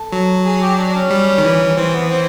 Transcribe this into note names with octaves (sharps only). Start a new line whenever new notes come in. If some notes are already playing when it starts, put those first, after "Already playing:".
Already playing: A4
F#3
G#4
G4
D4
C#4
G3
D#3
E3
E3 C4
B3
C4